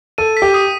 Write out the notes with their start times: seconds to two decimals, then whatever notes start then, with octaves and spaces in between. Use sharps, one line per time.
0.18 A4 D#7
0.37 B6
0.42 G4
0.54 D#6